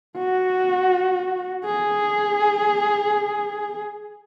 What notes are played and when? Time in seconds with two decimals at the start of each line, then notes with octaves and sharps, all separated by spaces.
0.18 F#4
1.66 G#4